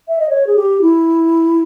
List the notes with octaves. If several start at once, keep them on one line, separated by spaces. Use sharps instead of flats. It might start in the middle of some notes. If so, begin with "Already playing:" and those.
E5
D#5
C#5
G#4
G4
E4